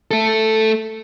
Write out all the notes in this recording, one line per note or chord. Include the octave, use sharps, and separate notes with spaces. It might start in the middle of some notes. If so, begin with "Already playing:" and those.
A3 A4